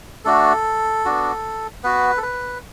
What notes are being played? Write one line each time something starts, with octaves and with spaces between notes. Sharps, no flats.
A3 D4 F#4 A4
B3 D4 F#4
B3 F#4 B4
A4
B4